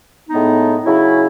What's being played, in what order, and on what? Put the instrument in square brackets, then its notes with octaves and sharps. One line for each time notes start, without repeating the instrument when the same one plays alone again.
[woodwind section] A2 G#3 B3 D#4
C#3 F#3 C#4 E4